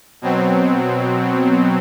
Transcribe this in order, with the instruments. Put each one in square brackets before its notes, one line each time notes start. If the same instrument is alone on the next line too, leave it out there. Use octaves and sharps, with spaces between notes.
[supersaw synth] B2 F#3 C4